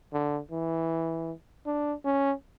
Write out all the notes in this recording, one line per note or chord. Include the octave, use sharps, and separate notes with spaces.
D3
E3
D4
C#4